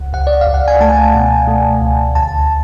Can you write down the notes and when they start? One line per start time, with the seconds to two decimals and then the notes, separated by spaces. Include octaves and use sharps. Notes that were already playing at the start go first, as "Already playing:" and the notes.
Already playing: C#2 F#5
0.13 C#2 F#5
0.27 D5
0.41 F5
0.47 C#2
0.54 F#5
0.68 G#5
0.81 A3 A5
1.15 B2
1.47 A3
1.82 C#2
2.15 D2 A5